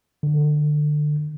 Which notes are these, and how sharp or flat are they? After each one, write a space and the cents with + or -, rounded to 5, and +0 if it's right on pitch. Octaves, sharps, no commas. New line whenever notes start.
D3 +25